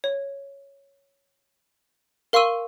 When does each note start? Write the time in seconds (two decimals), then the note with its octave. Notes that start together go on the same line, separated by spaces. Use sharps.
0.04 C#5
2.33 A#4 F5 C6 C#6 E6 D#7